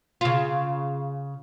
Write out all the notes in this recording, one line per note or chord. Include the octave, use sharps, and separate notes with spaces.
C#3 F4